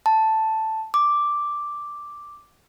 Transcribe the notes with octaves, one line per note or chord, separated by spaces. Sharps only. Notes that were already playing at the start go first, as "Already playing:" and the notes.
A5
D6